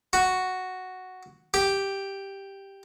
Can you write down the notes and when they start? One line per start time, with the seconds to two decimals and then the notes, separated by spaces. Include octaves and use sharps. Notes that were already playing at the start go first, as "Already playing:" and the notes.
0.13 F#4
1.54 G4